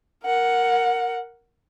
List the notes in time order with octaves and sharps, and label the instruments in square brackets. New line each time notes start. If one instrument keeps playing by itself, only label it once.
[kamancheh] A#4 F#5